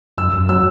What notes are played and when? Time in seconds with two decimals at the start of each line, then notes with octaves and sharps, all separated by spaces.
0.18 F#2 E6
0.33 F#2
0.49 F#3 E6